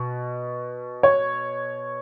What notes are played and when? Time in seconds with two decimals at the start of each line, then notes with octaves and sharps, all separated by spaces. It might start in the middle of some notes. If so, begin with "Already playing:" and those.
Already playing: B2
1.03 C#5